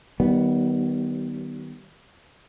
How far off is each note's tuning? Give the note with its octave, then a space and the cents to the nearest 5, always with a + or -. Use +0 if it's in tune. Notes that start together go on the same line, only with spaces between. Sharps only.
D#3 +0 G3 -35 B3 +0